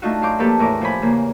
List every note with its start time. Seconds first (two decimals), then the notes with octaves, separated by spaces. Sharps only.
0.02 A3 D4 D#4 F4 F#4
0.22 F#2 F5 C6 D6 G6
0.39 F3 A#3 G4 A4 B4
0.59 E2 A2 A#4 D6
0.81 F3 C5 G#5 B5
1.02 E2 C#3 A#3